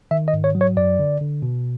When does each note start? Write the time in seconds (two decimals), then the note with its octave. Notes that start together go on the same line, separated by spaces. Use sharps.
0.11 D#3 E5
0.28 D#5
0.34 G#2
0.44 C#5
0.55 F#3
0.61 C#5
0.77 F#2 D5
0.99 D3
1.21 D3
1.42 B2